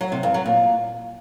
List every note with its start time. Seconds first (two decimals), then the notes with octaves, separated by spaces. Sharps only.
0.01 F#3
0.12 C3
0.23 G2
0.34 F#3
0.46 A#2